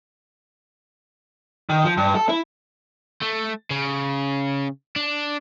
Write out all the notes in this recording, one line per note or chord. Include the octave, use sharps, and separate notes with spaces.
D#3
F3
G2
A4
E4
A3
C#3
D4